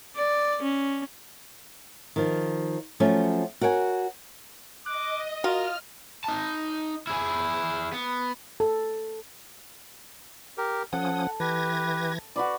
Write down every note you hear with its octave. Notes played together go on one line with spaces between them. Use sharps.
D5
C#4
D#3 F3
F3 F#3 A3 C#4
F#4 A#4 C#5 G5 G#5
D#5 D6 F#6
F4 F#4 A#4 F6
D#4 A5
E4 G#4
B3
A4
G4 A#4
F3 C#4 A4 F#5 D#6
E3 G4 B4 G#6 A#6
F#4 B4 D5